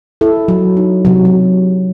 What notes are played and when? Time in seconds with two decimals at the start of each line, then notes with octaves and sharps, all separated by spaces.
0.21 E4 A4
0.48 F#3
0.77 D#4
1.05 C3 F#3
1.25 F#3